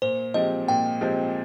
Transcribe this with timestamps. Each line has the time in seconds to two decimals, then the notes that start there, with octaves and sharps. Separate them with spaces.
0.02 A#2 C5
0.34 F3 G#3 C4 G4 D#5
0.68 A#2 G5
1.01 F3 G#3 C4 G4